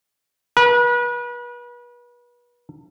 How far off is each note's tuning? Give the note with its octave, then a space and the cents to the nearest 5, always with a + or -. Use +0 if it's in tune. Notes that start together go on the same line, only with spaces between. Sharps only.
B4 -35